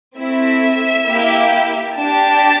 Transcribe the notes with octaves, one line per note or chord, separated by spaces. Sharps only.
A3 C4 E4 E5
A#3 E4 G4
D4 G4 A5